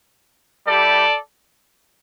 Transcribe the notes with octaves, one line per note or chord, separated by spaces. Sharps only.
G3 E4 G4 A4 D5